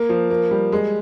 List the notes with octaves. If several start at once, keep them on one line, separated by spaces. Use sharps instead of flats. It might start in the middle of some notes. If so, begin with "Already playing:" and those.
Already playing: A#3
F3
A#3
G3
G#3